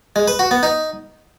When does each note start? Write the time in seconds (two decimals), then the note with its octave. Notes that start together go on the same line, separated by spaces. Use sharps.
0.16 G#3
0.28 B4
0.39 F#4
0.51 B3
0.63 D#4